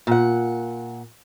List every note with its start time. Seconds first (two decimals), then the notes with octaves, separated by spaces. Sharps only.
0.07 A#2 F#5